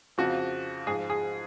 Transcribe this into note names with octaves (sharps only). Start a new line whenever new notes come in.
F2 C#3 F3 F#4
G#2 F3 G#4
G#4